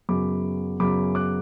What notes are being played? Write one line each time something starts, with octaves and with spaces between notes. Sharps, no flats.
F#2 C#3 F#3 B3 B5 D6
F#2 C#3 F#3 B3 B5 D6
D6 F#6